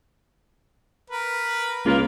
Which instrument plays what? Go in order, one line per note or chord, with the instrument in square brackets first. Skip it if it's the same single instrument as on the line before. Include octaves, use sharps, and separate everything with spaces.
[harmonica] A#4 B4
[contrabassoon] C#2 [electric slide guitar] A#3 F4 A#4